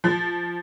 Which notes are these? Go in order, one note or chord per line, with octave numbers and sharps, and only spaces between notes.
F3